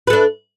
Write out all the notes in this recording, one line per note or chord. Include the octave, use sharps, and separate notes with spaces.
D4 A4 B4